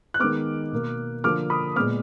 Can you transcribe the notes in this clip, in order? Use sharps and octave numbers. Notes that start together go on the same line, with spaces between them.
F#6
D#3 G#3 B3 D6 F6
B2 A#3
D3 F3 A#3 D6 F6
B5 D#6
A#2 G#3 B3 D6 F6